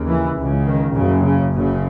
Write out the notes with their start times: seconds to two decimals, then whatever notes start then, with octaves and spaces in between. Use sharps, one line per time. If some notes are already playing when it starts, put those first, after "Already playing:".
Already playing: D#2 C#3
0.09 E3
0.38 C#2 C#3
0.66 D#3
0.94 F#1 F#2 C#3
1.23 C#3
1.52 F#1 F#2 C#3